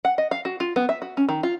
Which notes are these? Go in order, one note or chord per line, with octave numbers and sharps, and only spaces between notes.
F#5
D#5
F5
F#4
F4
B3
E5
F#4
C#4
D#3
F4